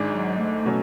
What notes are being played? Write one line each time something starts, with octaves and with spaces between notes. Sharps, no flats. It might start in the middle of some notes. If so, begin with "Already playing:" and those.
Already playing: G#1 G#2 G#3 D4
F#3
A3
B2 F#3 C#4